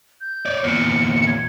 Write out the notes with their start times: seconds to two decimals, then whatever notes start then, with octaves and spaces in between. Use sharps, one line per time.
0.21 G6
0.46 C#5 D5
0.64 E2 A#2 C#7
1.27 G#6